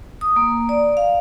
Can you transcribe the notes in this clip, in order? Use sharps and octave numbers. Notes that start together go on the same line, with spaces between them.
D#6
A#3
D5
F5